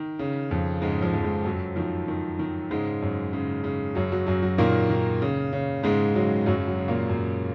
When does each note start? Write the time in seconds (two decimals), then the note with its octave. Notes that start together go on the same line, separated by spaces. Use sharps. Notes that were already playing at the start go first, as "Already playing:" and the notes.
Already playing: D#3
0.19 C#3
0.51 F2
0.82 G#2 C#3 G#3
1.02 F3
1.14 F2
1.23 G#2 G#3
1.45 F#2 F#3
1.76 D#3 F3
2.08 D#3
2.39 D#3
2.70 G#2 C#3 G#3
3.02 F#2
3.33 C#3
3.64 C#3
3.95 F#2 F#3
4.12 F#3
4.27 F#2 F#3
4.43 F#3
4.58 A#2 D#3 A#3
4.90 D#3
5.22 C#3
5.53 C#3
5.83 G#2 C#3 G#3
6.15 C#3 F#3
6.46 F#2 F#3
6.68 F#3
6.77 C#3
6.88 A#2 A#3
7.09 F#2